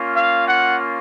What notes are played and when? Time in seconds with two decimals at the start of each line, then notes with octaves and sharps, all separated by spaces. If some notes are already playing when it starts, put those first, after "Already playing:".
Already playing: A#3 C#4 F4
0.14 F5
0.47 F#5